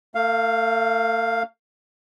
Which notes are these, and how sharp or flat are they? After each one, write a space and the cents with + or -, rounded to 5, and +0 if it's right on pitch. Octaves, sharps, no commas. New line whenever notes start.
A3 +45 F5 +0